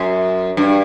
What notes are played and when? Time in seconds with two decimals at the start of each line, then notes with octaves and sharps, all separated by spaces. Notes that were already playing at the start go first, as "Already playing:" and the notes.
Already playing: F#2
0.57 G2